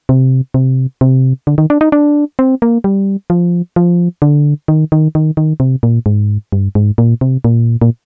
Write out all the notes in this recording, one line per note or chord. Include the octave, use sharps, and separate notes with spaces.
C3
C3
C3
D3
D#3
D4
D#4
D4
C4
A#3
G3
F3
F3
D3
D#3
D#3
D#3
D#3
C3
A#2
G#2
G2
G#2
A#2
C3
A#2
A#2